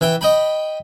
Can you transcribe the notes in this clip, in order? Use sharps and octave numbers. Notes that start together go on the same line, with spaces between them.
E3 E5 G5
D#5 G5 B5